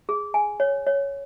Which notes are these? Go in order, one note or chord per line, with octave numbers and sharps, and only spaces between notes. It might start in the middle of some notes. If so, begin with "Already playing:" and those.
G#4
G#5
C#5
C#5